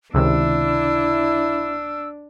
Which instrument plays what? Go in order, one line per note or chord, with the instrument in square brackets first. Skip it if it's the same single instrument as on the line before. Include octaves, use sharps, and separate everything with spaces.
[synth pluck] C#2 C3 D#3 [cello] D4 [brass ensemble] E4 [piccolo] E6